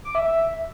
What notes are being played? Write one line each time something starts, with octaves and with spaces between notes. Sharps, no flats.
D6
E5
E5